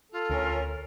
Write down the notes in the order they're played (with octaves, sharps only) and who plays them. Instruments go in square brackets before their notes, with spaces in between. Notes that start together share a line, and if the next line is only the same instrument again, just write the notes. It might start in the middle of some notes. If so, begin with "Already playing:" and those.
[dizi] F4 [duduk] A4
[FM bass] D2 [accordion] C#4 A#4